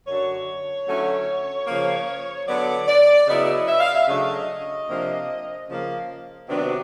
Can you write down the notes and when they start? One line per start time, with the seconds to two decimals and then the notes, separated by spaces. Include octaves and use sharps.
0.06 F#2 D3 F#3 C#5
0.87 D3 F#3 A3 C#4 E4
1.67 C#3 F3 A#3
2.47 D3 F#3 B3 D5
2.88 D5
3.27 C#3 F#3 B3 E4 D#5
3.67 E5
3.80 F5
3.93 E5
4.07 C#3 F#3 A3 D4 D#5
4.88 C3 F3 A#3 D4
5.68 C#3 F3 A#3
6.48 C3 D#3 F#3 B3 D4